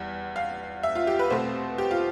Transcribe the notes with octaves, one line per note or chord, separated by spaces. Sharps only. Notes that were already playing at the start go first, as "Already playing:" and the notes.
Already playing: E2 G3
F5
E5
F4
G4
B4
B2 A3 C4 C5
G4
F4